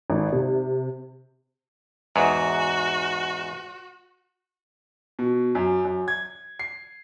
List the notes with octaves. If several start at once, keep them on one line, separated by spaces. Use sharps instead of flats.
G#1
C3
E2 G#2 F#4
B2
F#2
F#2
G#6
C7